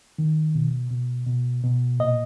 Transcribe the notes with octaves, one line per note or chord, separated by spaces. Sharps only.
D#3
B2
B2
B2
B2
A#2 D#5